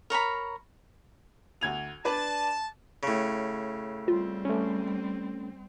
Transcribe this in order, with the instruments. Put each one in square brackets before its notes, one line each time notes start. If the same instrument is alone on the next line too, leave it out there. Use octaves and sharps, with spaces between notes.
[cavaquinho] A#4 C#5 A#5 B5
[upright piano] D2 G#6 F7
[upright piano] D4 B4 D5 [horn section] A5
[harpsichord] A2 C#3
[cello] G3 C4 [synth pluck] F4
[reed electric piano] A3 C#4